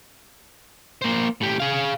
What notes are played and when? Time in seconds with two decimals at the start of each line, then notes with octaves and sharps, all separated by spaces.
1.02 A#3 C5
1.41 A2 G4
1.60 G#4 F5